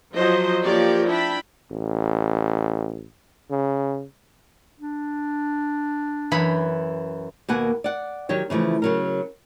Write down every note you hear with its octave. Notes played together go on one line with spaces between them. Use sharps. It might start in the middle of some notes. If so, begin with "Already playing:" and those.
F3 F#3 C5 D#5
F3 A#3 G4 A#4 C#5 D5
D4 E4 G5 A5 B5
A1
C#3
D4
F#2 E3 B5
D#2 B2 A#3 B4 F#5 G#5
D5 F#5
D#3 F#3 G4 C#5
C#3 E3 F3 A3
C#3 F#3 A#4